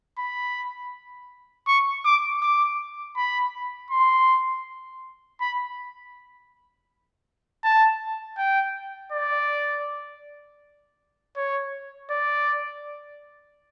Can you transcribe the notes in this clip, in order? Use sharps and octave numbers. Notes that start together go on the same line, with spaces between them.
B5
C#6
D6
D6
B5
C6
B5
A5
G5
D5
C#5
D5